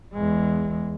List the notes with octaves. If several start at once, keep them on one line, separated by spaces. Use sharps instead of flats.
E2 G#3